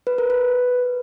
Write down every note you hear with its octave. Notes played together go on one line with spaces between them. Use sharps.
B4
A#4
B4